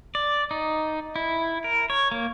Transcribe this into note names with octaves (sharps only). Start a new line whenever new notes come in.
D5
D#4
E4
A#4
C#5
A#3